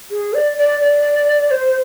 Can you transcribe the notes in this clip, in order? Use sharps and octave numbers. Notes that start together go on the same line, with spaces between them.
G#4
D5
D5
D5
C5